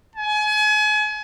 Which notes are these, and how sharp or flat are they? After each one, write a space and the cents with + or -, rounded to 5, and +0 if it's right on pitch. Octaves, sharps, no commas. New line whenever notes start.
G#5 +35